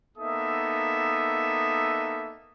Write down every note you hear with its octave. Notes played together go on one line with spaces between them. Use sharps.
A#3 B3 D#4 A4 E5 D#6